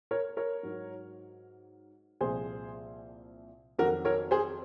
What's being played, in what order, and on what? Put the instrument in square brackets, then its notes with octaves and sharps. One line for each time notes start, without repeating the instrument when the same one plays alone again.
[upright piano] A#4 C#5
A#4 C#5
G#2 F#3
C2 A#2 F3 G#4 C5
F2 D#3 F#3 F#4 A#4
A#4 C#5
G#4 C5